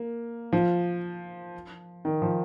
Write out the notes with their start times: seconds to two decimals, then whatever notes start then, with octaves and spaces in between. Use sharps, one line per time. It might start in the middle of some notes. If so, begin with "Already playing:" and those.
Already playing: A#3
0.52 F3
2.05 D#3
2.22 F3